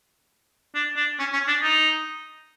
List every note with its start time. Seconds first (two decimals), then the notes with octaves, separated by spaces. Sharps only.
0.75 D4
0.96 D4
1.19 C#4
1.33 C#4
1.48 D4
1.62 D#4